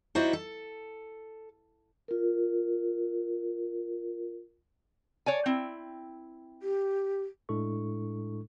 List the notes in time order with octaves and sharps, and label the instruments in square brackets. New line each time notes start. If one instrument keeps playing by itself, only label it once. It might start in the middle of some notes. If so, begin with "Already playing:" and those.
[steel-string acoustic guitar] D#4 E4 F#4 C5 D5
A4
[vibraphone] F4 A#4
[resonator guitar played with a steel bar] C#5 D5 G#5
C4 E4
[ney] G4
[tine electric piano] A2 G#3 D4 E4 A4 C#6